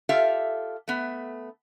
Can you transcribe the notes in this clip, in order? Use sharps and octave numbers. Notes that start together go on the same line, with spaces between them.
F4 G4 A4 E5 F5
A3 B3